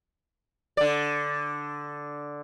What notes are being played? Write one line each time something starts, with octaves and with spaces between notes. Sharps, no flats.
D3 D5